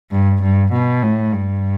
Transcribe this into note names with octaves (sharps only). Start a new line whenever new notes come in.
G2
G2
B2
A2
G2